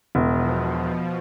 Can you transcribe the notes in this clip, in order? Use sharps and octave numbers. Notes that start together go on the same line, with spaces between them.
E1 B2 F3